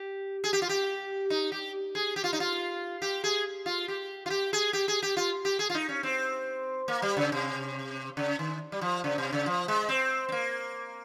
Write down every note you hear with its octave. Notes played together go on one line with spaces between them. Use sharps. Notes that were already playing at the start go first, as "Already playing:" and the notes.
Already playing: G4
G#4
G4
F4
G4
D#4
G4
G#4
G4
F4
D#4
F4
G4
G#4
F4
G4
F4
G4
G#4
G4
G#4
G4
F4
G4
G#4
F4
D#4
C#4
C4
A#3
G3
C#3
C3
C#3
D#3
G3
F3
C#3
C3
C#3
F3
G#3
C4
C4
A#3